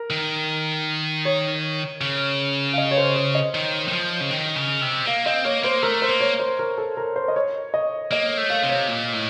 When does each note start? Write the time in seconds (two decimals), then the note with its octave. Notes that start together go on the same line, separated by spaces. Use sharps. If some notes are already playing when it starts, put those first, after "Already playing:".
Already playing: A#4
0.10 D#3
1.25 C#5
2.01 C#3
2.74 F5
2.78 D#5
2.91 C#5
2.97 C5
3.16 C#5
3.35 D#5
3.54 D#3
3.88 D#3
3.93 F3
4.20 C#3
4.31 D#3
4.56 C#3
4.81 C3
5.06 A#3 F5
5.26 C4 D#5
5.44 A#3 C#5
5.64 A#3 C5
5.82 A3 A#4
6.02 C5
6.09 A#3
6.21 C#5
6.40 C5
6.59 A#4
6.78 A4
6.97 A#4
7.16 C5
7.28 D#5
7.36 C#5
7.74 D#5
8.11 A#3 D#5
8.38 A3
8.50 F5
8.63 C3
8.69 C#5
8.88 A#2
9.13 A2